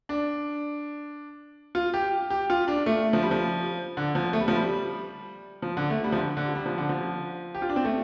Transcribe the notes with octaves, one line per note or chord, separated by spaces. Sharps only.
D4
F4
G4
G4
F4
D4
A3
F3
G3
F3
D3
F3
A3
G3
F3
G3
F3
D3
A3
G3
F3
D3
D3
G3
F3
D3
F3
G4
F4
D4
C4
A3